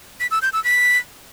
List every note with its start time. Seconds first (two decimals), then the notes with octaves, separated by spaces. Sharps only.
0.20 B6
0.31 E6
0.42 G6
0.53 E6
0.64 B6